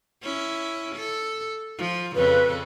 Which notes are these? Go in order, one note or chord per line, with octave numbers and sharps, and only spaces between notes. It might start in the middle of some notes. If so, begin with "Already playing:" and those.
C#4 E4
A4
F3
F2 C#3 A4 B4